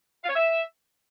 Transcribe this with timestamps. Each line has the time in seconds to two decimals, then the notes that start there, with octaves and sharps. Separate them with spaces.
0.24 F5
0.29 C#5
0.35 E5